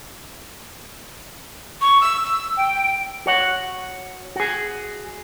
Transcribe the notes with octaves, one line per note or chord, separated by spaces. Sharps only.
C#6
E6
E6
G5
F#4 C#5 F#5
F#4 G#4